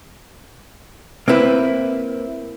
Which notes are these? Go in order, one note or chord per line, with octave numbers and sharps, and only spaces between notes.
A#3 C4 E4 B4